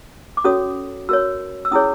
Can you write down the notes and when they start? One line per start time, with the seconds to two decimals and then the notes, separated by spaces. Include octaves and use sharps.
0.37 D6
0.44 C#4 F#4 A4 C#5 D#6
1.09 F#4 A#4 C#5 E6
1.65 E6
1.71 C#4 E4 G#4 C#5 D#6